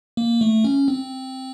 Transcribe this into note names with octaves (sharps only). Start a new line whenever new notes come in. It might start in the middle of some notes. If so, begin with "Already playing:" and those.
A#3
A3
C#4
C4